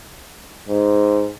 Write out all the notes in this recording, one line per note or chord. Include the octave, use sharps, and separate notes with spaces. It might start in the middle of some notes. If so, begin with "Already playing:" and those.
G#2